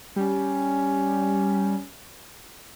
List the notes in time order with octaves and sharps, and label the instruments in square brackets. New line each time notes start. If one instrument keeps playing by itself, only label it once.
[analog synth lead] G3 [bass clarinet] C#4